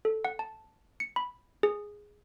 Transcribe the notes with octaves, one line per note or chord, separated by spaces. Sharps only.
A4
F#5
A5
C#7
B5
G#4